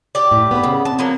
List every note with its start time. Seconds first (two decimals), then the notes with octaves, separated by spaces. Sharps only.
0.15 G4 D5
0.31 A2
0.51 B3 B4
0.64 C#3
0.85 C4 A5
0.99 F3 F#3 A#3